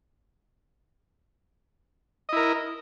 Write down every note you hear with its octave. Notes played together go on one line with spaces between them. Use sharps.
E4 A#4 D#5